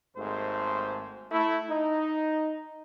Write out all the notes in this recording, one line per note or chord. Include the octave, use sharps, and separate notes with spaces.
G#1 D#2 G#2 A3 C5
A3 E4
D#4